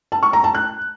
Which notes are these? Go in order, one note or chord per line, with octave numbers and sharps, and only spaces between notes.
A5
C#6
A#5
A5
F#6